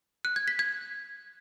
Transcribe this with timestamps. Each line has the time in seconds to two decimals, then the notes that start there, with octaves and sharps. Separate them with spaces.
0.25 F#6
0.36 G#6
0.48 B6
0.59 G#6